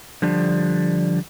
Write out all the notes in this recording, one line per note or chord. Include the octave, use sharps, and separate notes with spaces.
D3 F3 G3 D4